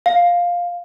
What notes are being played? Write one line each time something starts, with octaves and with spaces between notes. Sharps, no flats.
F5